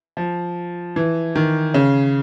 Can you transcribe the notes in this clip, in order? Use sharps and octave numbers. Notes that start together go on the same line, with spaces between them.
F3
E3
D#3
C#3